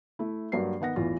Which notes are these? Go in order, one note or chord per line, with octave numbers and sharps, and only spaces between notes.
A3 E4
G2 F#3 A#3 B4 C7
D#3 B3 F#5 A#6
A1 E2 E3 F4